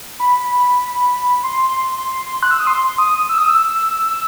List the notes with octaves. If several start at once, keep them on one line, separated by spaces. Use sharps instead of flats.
B5
C6
F#6
E6
D#6
C6
D#6
E6
D#6
E6